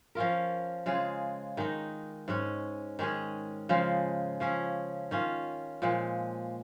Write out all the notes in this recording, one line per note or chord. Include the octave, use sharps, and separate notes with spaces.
F3 C#4 F4 A#4
C#3 G#3 F4 G#4
D#3 G#3 D#4
G#2 G#3 C#4
D#3 G#3 C#4 G#4
C#3 F3 G#3 F4
F3 C#4 G#4
D#3 C#4 F4
A#2 F3 G#3